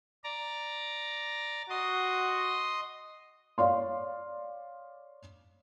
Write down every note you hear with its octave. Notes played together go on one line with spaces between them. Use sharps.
D5 A#5
F#4 D#5 C6 D#6
C#5 D5 F5 C6